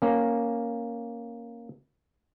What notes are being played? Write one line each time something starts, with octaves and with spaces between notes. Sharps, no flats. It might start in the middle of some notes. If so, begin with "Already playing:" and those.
A#3 C#4